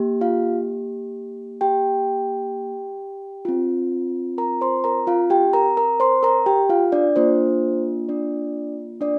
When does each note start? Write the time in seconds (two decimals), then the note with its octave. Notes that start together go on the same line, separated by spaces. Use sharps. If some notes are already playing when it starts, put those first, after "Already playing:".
Already playing: A#3 G4
0.21 F4 F5
1.61 G4 G5
3.45 C4 F4
4.38 A#4 A#5
4.61 C5 C6
4.84 A#4 A#5
5.07 F4 F5
5.30 G4 G5
5.53 A#4 A#5
5.77 A#4 A#5
6.00 C5 C6
6.23 A#4 A#5
6.46 G4 G5
6.69 F4 F5
6.92 D4 D5
7.16 A#3 D4 F4 C5
8.08 D4 D5
9.01 D4 D5